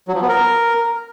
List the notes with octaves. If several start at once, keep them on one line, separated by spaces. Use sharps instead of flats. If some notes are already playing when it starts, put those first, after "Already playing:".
F#3
F3
B3
A#4